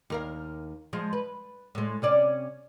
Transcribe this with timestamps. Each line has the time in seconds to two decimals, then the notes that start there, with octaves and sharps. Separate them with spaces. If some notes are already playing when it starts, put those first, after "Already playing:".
0.10 D#2 A#4 F5
0.93 F3 G#3
1.13 B4
1.75 A2 G#3
2.02 C3 C#4 D5